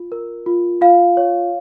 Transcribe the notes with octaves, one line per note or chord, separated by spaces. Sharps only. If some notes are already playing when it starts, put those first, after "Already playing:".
Already playing: F4
A#4
F4
F4 F5
C#5